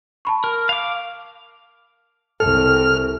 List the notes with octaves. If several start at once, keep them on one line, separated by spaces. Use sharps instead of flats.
A5 B5 C#6
A#4
F5 D6
C2 A4 F6